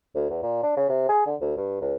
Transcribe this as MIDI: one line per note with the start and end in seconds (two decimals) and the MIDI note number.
0.15 0.28 38
0.30 0.42 40
0.43 0.58 46
0.63 0.73 62
0.77 0.85 49
0.89 1.06 48
1.09 1.23 68
1.26 1.35 50
1.41 1.56 38
1.57 1.81 43
1.81 1.95 37